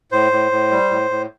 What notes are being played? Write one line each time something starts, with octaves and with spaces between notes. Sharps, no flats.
A2 C5
A2
A2
G3
A2
A2